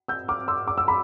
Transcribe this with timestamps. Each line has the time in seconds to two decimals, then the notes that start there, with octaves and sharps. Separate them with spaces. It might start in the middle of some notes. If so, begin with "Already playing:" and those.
0.08 E6 G6
0.28 D6 F6
0.48 C6 E6
0.68 D6
0.78 E6
0.88 B5